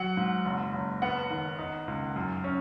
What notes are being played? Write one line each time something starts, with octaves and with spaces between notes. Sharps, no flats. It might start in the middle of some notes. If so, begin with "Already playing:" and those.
Already playing: F#3 F#5
G#2
F#1
F#1
B3 F#5
D#3
D#4
C#2
F#2
C#4